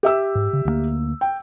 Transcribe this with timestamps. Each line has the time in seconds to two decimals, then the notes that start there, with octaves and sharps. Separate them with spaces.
0.03 G4 E5 E6
0.35 G#2
0.53 C#3
0.65 D2 D#3 A#3
1.21 G5